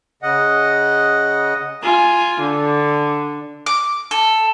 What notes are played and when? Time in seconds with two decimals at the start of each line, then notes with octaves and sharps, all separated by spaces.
0.22 C#3 D#5 F#5
1.83 F4 G#5
2.40 D3
3.66 D6
4.11 A4